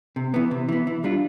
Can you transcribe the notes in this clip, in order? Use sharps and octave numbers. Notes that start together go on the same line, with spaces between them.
C3
E3 B3
C3
E3 B3
E3
G3 D4 F4